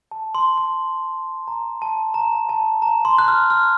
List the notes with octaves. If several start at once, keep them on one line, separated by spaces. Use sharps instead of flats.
A5
C6
C6
A#5
A5
A#5
A5
A#5
C6
F#6
F6
F6